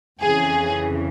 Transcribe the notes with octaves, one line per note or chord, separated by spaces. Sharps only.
F2 C#3 E3 G#4